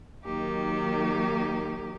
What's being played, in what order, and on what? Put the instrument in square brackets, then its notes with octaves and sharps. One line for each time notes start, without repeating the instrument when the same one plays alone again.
[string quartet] D#3 F#3 A#3 D#4 G4